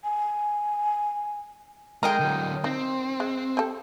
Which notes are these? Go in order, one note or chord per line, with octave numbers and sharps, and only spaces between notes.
G#5
G#3 A#4 D#5 G5 A#5
D3 F#3
C4 D#4
G#3
C4 G4 A4